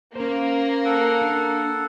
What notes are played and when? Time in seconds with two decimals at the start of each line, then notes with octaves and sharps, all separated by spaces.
0.15 A#3 C#4 C5
0.85 A4 F#5
1.22 D4